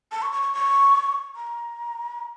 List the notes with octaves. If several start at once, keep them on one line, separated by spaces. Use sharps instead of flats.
A5
C#6
C#6
C#6
C#6
A#5